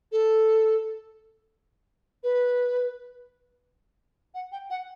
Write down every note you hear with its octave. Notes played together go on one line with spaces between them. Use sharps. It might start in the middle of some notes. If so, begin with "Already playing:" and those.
A4
B4
F#5
G5
F#5